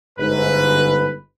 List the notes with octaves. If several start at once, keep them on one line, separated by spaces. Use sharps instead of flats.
G1 G#2 B4